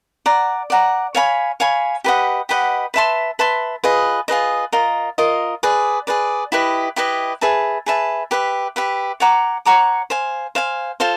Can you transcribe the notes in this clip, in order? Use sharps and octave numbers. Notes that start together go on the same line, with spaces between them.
D5 F#5 A#5
D5 F#5 A#5
C#5 F5 G#5 B5
C#5 F5 G#5 B5
G4 B4 D#5 F#5
G4 B4 D#5 F#5
B4 E5 A5 C6
B4 E5 A5 C6
F4 G#4 B4 D#5
F4 G#4 B4 D#5
F4 A#4 D#5
F4 A#4 D#5
G#4 B4 D5
G#4 B4 D5
E4 G4 B4 D#5
E4 G4 B4 D#5
G#4 B4 E5 A5
G#4 B4 E5 A5
G4 B4 E5
G4 B4 E5
C#5 F#5 A#5 D6
C#5 F#5 A#5 D6
C5 F5 G#5
C5 F5 G#5
F4 A4 C5 F5